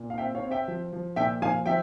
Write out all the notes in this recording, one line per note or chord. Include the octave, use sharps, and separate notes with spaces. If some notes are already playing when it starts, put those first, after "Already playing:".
Already playing: A#2
F5
C4 E5 G5
C#5 F5
C4
E5 G5
F3
F3
A#2 E5 G5
F3 F5 G#5
F3 E5 G5